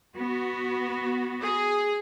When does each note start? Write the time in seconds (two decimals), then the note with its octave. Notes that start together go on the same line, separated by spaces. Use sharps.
0.15 B3 F#4
1.42 G#4